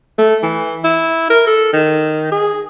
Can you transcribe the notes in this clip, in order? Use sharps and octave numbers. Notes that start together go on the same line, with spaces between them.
A3
E3
E4
A#4
A4
D#3
G#4